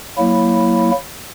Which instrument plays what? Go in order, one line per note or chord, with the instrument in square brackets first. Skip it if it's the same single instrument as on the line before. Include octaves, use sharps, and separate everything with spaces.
[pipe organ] F#3 A#3 E4